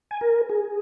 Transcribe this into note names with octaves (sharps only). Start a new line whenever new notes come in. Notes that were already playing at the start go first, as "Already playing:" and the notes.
G#5
A#4
G#4